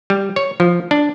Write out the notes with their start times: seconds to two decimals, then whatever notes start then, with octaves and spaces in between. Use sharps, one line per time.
0.10 G3
0.36 C#5
0.60 F3
0.91 D4